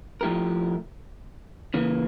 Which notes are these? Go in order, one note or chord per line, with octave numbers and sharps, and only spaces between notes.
F3 A3 E4 G4 A#4
C#3 E3 A#3